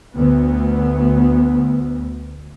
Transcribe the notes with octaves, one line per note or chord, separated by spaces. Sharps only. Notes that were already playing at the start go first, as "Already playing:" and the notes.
D2 B3